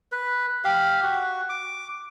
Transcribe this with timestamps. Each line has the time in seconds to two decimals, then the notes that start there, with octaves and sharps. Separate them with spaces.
0.12 B4
0.64 G4 F5
1.03 F#4
1.49 D6